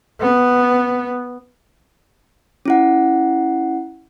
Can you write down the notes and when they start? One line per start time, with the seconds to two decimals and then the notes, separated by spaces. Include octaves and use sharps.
0.21 B3
2.66 C#4 E4 F#5